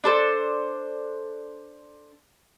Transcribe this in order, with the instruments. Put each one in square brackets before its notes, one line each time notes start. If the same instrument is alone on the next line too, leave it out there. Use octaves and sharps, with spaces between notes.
[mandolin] D4 A4 C5